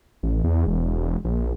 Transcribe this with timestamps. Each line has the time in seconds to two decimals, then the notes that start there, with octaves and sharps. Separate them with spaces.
0.23 A1
0.44 E2
0.67 E1
1.25 A#1